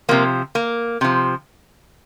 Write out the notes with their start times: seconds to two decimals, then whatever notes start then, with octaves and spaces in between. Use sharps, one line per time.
0.09 C3 F3 A#3
0.55 A#3
1.01 C3 F3